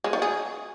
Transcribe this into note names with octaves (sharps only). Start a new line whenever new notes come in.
G#3
D#3
G#4